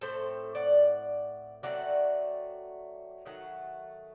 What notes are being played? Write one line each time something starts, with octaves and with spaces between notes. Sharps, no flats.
A2 A3 C4 A4 C5
D5 F#5
F#3 A3 C4 D5 F#5
D#3 F#3 A3 F#5